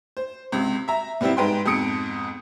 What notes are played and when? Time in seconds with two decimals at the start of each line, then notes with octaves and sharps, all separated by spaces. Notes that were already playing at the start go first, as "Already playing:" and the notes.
0.17 C5
0.52 C#2 C3
0.88 E5 A#5
1.21 B2 G3 B3 C4 E4
1.37 G#2 B4 G5 C6
1.66 F2 G#2 B2 D#6 C#7 D7